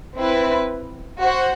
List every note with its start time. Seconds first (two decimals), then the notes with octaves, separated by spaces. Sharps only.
0.16 C4 E4 B4
1.20 F#4 C5 F#5